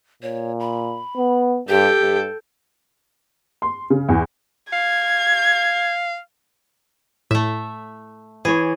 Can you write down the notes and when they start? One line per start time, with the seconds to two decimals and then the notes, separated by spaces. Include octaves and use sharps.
0.23 A#2 C#5
0.60 B5
1.17 B3
1.69 G2 G4 A4 G5
2.01 G2
3.62 C6
3.90 C#3
4.09 E2
4.73 F5 G#6
7.31 A2 A3 E5
8.45 E3 G#4 C#5